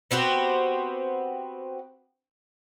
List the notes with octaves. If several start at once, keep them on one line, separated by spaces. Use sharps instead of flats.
B3 C4 F#4 G4